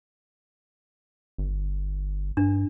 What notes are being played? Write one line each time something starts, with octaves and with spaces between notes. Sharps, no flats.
G1
G2 D4